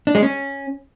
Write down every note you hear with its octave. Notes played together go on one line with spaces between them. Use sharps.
D4
G#3
C#4